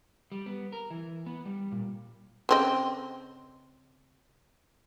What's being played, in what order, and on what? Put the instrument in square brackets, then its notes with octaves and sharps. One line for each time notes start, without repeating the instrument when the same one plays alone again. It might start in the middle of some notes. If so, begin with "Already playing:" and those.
[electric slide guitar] G3
B3
A#4
E3
B3
G3
A#2
[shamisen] C#3 C4 D#5